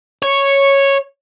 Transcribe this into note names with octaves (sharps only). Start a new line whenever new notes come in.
C#5